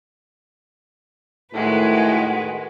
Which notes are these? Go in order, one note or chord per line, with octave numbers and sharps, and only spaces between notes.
A2 D#3 G#3 F#4 B4